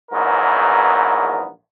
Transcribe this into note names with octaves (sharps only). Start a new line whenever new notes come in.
A#1 E2 G#2 F#3 B3 A#4